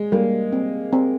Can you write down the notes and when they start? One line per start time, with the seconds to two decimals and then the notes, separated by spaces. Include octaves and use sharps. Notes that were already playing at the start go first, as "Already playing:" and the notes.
Already playing: G#3
0.12 G3 A#3
0.52 C4
0.93 C4